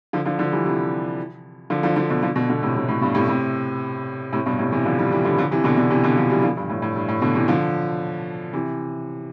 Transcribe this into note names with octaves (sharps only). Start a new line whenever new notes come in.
D3 F3
D3 F3
D3 F3
E3 G3
C3 E3
D3 F3
D3 F3
D3 F3
B2 D3
D3 F3
B2 D3
B2 D3
A2 C3
A2 C3
A2
G2 B2
A2 C3
A2 C3
A2 C3
G2 B2
A2 C3
C3 E3
D3 F3
E3 G3
E3 G3
D3 F3
D3 F3
C3 E3
B2 D3
B2 D3
C3 E3
B2 D3
D3 F3
E3 G3
D3 F3
G2
A2
A2
G2
A2
B2 D3
C3 E3
D3 F3
C3 E3